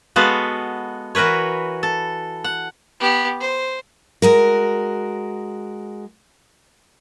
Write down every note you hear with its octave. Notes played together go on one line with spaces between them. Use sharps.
G#3 B3 F#4 A4 B4 F5
E3 F#4 A#4 B4 C#5
A4
F#5
B3 G4
C5
G#3 F#4 A#4